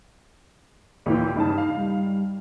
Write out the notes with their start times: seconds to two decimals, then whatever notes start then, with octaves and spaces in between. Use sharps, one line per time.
1.06 D#2 A#2 E3 G5
1.36 G2 C#3 D#4 A5
1.58 F5
1.77 G3